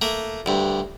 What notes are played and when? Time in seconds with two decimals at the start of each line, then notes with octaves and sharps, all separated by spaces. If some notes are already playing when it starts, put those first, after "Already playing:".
0.02 A3 A#3
0.46 D2 G2